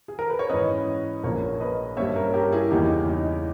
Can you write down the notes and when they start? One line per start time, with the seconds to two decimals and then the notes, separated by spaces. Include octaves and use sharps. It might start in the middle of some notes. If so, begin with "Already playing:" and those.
0.08 G#4
0.19 A#4
0.30 B4
0.39 C#5
0.49 G#2 E3 G#3 C#4 B4 D#5
1.23 A#1 A#2 A#3 A#4 C#5
1.60 B4 D#5
1.97 G2 G3 A#3 C#4 C#5 E5
2.16 A#4 C#5
2.34 G4 A#4
2.52 E4 G#4
2.70 E2 C#3 E3 A#3 C#4 D#4 G4
3.08 D#4